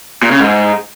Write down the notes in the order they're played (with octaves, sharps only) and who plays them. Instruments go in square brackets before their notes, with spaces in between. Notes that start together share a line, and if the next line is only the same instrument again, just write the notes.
[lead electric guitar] A#2
C#3
G#2